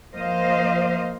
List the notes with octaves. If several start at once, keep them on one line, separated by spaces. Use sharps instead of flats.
F3 A#3 C5 D#5 F5